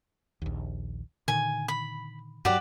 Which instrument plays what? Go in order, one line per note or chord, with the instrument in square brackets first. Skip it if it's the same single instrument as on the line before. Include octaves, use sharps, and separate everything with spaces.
[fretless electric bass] A#1 D#2
[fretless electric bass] A#2 D3 D#3 [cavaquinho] G#5
[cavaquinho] B5
[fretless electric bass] G2 F#3 [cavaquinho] F#4 G4 D5